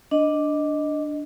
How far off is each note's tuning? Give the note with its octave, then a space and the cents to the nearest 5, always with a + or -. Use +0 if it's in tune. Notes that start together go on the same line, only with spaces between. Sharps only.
D4 +0 D#5 +0